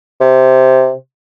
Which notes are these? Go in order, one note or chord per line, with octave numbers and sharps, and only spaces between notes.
C3